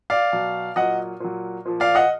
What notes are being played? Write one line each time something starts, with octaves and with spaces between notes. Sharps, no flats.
D5 F5
B2 F#3
A#2 F#3 D#5 F#5
A#2 F#3
A#2 F3
D5 F5
D#5 F#5